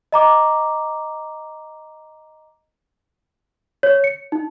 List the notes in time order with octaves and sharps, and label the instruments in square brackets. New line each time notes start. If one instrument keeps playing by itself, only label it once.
[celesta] D#5 A#5 D6
C#5
C#7
D#4